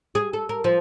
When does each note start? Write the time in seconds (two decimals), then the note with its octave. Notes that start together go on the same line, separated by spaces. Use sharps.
0.15 G#4
0.33 A4
0.49 A#4
0.64 F3